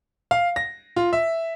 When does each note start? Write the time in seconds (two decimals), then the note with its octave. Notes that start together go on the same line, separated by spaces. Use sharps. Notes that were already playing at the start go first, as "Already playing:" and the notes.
0.31 F5
0.56 A#6
0.96 F4
1.13 E5